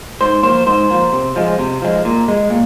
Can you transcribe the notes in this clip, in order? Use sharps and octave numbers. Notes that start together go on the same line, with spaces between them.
G#2 C5
F3 A#3 C5
G#2 C5
F3 A#3
C3
F3 G#3
C3
F3 G#3
A#2
G#3
A#2